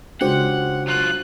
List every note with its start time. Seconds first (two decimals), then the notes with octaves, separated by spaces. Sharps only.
0.21 C#2 D4 F#4 G4 C5 F#5
0.88 F#3 F4 F#6